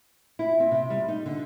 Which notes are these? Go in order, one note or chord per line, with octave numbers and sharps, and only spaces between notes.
E4
C4
C3
G3
D#4
D3